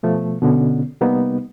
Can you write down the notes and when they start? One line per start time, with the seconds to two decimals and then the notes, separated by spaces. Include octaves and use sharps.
0.03 B2 F3 A3
0.42 B2 D3 B3 C#4
1.01 C3 G3 A#3 B3 D#4